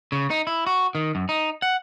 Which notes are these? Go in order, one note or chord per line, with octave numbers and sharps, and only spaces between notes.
C#3
D#4
E4
F#4
D#3
F#2
D#4
F#5